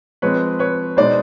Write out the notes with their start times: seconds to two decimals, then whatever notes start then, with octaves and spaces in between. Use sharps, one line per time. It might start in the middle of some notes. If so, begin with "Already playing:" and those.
0.22 F3 G#3 C4 B4 C#5
0.59 B4 C#5
0.97 B2 G#3 B3 D#4 C5 D5